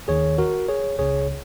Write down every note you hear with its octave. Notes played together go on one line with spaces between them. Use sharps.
D#2 D#3 G#4 C#5
F#4 A#4
G#4 C#5
C#2 C#3 G#4 C#5